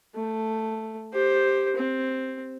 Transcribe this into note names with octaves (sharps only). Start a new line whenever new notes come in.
A3
G4 C5
C4